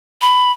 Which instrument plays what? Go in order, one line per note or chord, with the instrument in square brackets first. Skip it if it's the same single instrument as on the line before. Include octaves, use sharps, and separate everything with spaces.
[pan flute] B5